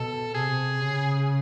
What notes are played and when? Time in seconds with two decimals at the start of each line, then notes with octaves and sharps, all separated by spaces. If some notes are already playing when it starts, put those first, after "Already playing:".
Already playing: B2 A4
0.34 C3 G#4
0.84 C#3